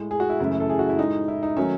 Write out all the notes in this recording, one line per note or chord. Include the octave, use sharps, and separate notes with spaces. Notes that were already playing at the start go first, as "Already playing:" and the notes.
Already playing: A2 G#3
G#4
F#4
E4
F#2 C#3 E3 A3
A4
G#4
F#4
E4
A2 G#3 D#4
E4
D#4
D#3 F#3 A3 C#4